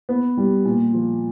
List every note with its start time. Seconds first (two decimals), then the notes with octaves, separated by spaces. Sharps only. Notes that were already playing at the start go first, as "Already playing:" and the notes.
0.09 B3
0.37 G3
0.65 A#2
0.93 F3